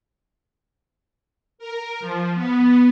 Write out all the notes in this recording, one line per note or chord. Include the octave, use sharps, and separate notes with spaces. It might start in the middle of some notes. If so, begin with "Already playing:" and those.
A#4
F3
B3